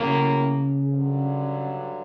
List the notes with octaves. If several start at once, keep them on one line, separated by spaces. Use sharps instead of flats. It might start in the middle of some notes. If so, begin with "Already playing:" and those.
Already playing: A2 C#3 F#3 A#3
G2 D3 F#3